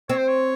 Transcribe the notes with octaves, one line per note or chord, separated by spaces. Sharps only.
C4 C#5
C5
C#5